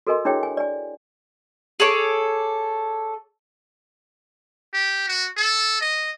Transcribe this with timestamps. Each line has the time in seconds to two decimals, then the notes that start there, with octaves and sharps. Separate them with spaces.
0.07 F#4 A4 A#4 D#5 G#5 C6
0.25 D4 E4 G#4 C#5 G5
0.43 G#5
0.57 D5 G#5
1.80 G#4 A4 C#5 D6
4.73 G4
5.08 F#4
5.37 A4
5.81 D#5